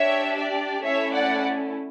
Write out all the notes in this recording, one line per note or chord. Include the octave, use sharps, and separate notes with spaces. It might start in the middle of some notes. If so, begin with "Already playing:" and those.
Already playing: D4 G4 C#5 E5
D5
A3 C#4 E4 A4 C#5 E5
D5 F#5